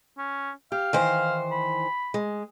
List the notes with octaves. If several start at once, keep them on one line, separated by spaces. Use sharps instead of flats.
C#4
G4 F5
D#3 E3 C5
B5
G#3